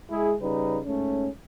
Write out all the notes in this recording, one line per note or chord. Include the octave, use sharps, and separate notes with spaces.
G#3 E4 G#4
C#3 G3 D#4 B4
G#2 A3 C#4